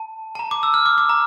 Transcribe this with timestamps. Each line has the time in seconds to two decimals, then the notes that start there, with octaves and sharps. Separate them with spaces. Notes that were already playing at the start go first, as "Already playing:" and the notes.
Already playing: A5
0.35 A5
0.39 A#5
0.51 D6
0.63 E6
0.74 F6
0.86 D6
0.98 D6
1.09 A#5